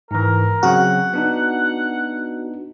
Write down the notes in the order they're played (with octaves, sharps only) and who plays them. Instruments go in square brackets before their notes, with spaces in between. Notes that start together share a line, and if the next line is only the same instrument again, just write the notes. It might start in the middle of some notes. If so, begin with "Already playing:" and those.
[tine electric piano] G#2 E3 [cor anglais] A#4
[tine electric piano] C#3 F#3 C4 [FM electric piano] F#4 [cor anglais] F#5
[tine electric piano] B3 D4 D#4